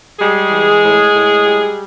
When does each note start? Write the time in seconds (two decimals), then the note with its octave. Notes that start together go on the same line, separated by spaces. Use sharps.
0.19 G3 G#3 G#4
0.51 E3
0.82 A2
1.14 A2
1.46 G3